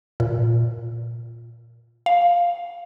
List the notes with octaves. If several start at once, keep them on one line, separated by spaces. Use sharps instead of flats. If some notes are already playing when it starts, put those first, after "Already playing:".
A#2
F5